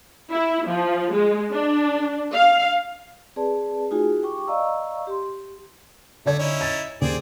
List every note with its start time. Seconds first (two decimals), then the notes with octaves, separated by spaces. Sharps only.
0.32 E4
0.68 F3
1.13 G#3
1.52 D4
2.33 F5
3.36 C4 G#4 B4 D5 A5
3.91 A3 D#4 F4 F#4 G#4 G#5
4.23 G4 G5 C#6 D6
4.47 D5 D#5 F5 A#5 C#6 E6
5.07 G4 C6
6.26 D3 A3 D5 G#6
6.39 C#4 D#4 E4
6.61 A6
7.01 D#2 C4 G#4 D5